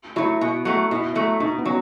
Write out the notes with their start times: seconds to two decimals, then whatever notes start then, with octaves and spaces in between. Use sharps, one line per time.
0.16 F#3 A3 E4
0.41 B2
0.65 F#3 A3
0.91 B2 E4
1.15 F#3 A3
1.40 B2 D#4
1.58 B3
1.65 F#3 C#4